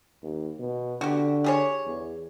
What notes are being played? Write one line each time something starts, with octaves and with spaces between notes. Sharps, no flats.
D#2
B2
D3 F#4 G4
G4 G#4 C#5
E2